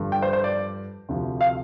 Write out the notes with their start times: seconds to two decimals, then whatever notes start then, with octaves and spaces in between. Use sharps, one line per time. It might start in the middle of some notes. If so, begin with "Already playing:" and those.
Already playing: G2 D3 F3
0.12 G5
0.22 C5
0.33 C5
0.44 D5
1.09 D2 C3 F3
1.41 F5